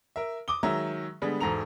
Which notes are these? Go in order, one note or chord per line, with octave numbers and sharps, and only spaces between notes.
A#4 E5
D6 D#6 G7
D#3 F#3 G#3 E5 A#5
D3 G3 G#3 B3
E1 G#2 A4 A#5 F7